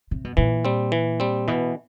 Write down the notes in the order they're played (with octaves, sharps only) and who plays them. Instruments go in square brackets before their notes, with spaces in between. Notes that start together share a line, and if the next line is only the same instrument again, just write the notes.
[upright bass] C3
B2
[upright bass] A#2 [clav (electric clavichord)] E3
[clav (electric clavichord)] G3 C4
E3
G3 C4
[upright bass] B2 [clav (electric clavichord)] E3